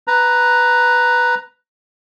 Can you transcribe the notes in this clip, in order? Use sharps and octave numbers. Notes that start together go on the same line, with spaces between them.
B4 A#5